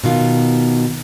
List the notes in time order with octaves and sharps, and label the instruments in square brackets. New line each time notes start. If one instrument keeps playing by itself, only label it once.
[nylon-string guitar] B2 D#3 F4